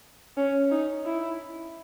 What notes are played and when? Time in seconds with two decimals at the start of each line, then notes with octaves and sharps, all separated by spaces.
0.37 C#4
0.71 D#4
1.05 E4